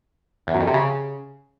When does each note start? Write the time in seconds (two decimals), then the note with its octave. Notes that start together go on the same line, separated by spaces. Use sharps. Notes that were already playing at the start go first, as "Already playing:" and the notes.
0.47 E2
0.54 F#2
0.60 F2
0.67 C3
0.74 C#3